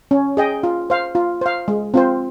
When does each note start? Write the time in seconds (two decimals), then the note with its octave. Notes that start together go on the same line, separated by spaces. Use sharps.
0.11 C#4
0.37 G#4 D#5 G5
0.63 F4
0.90 C5 F5
1.15 F4
1.41 C5 F5
1.68 G#3
1.94 C4 F4 C5